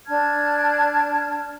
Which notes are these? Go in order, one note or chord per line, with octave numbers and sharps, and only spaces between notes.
D4 A5 F6 G#6